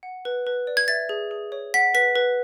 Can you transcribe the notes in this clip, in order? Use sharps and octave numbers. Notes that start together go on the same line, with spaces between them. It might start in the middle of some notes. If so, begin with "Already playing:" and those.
F#5
B4
B4
D5
G#6
E5 A6
G#4
G#4
C#5
F#5 B6
B4 B6
B4